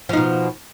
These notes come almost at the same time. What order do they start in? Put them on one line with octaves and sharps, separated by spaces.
F3 D#4 B2